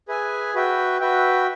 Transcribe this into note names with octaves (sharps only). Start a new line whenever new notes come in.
G#4 B4 E5 G#5
F#4 B4 E5 G5
F#4 B4 E5 G5